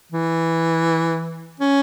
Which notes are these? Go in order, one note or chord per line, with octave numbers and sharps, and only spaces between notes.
E3
C#4